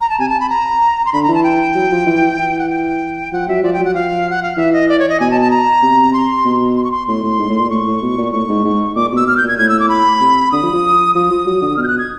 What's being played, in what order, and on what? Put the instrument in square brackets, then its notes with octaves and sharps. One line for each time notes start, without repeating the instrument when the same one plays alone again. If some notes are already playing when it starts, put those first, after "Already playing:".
[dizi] A#5
A5
[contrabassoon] C3 [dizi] G#5
[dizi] A5
B5
A#5
C6
[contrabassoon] D3 [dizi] B5
[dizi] A#5
[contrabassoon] E3
[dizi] A5
G5
[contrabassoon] F#3
F3
E3
E3
[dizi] F#5
G5
[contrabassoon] F3 [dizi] F#5
[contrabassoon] F#3 [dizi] E5
[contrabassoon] F3 [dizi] D5
[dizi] G5
[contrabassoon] F#3
[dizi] F#5
[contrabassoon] F3 [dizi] F5
[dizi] F#5
F5
[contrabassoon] E3 [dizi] E5
[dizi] D#5
D5
C#5
D#5
[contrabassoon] B2 [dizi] G#5
[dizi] A5
A5
A#5
[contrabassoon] C3
[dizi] C6
[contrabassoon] B2
[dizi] C6
C#6
C6
[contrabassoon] A2 [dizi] C6
[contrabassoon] A2
G#2
A2
A#2
[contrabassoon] A2 [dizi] C#6
[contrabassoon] A2
B2
A#2
[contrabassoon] A2 [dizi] C#6
[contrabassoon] G#2
G#2
[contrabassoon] A#2 [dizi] D6
[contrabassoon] B2 [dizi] E6
[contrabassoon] B2 [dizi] F6
[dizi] G6
[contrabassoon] A#2
[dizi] G#6
[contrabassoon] A2 [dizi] G#6
[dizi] E6
D6
B5
[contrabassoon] C3
[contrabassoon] D3 [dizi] D#6
[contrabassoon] F3
F3
[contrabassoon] F3 [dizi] D#6
[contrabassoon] F3
F#3
D3
[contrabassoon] B2 [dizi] F6
[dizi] G6
F#6
G#6